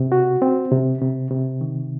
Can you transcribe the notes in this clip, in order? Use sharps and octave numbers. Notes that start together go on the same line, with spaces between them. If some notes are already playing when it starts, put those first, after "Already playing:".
Already playing: C3
F#4
C4
C3
C3
C3
D#3